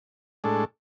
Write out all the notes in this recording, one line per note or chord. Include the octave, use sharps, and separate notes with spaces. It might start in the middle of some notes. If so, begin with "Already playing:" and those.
A2 G#3 D4 A4